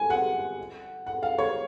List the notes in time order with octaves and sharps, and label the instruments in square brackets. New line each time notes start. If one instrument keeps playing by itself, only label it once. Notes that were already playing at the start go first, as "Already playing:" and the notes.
Already playing: [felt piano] G#5
F#5
F#5
F5
C#5